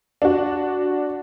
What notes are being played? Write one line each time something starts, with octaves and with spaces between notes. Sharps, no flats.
D4 F#4